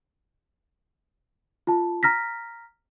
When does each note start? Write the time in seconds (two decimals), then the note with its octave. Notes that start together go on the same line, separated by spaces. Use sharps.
1.67 F4 A5
2.03 A#5 F6 A#6 B6